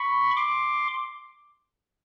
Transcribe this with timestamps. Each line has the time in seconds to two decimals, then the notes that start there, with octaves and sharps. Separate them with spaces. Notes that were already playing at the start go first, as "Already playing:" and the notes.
Already playing: B5 C#6
0.37 C6 D6